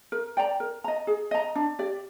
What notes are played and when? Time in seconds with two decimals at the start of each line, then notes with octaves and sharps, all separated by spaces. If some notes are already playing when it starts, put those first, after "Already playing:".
0.12 A#4
0.37 D5 G5 A#5
0.60 A#4
0.84 D#5 A#5
1.07 G#4
1.31 D#5 A#5
1.56 D4
1.79 G4 D5